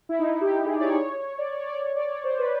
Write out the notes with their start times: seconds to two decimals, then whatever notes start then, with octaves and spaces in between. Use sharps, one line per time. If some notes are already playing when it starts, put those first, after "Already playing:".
0.09 E4
0.19 D#4
0.30 E4
0.41 G4
0.52 G4
0.66 G#4
0.77 D5
0.81 C#5
0.95 C#5
1.16 C#5
1.38 D5
1.53 C#5
1.66 D5
1.81 C#5
1.96 D5
2.10 C#5
2.24 C5
2.39 B4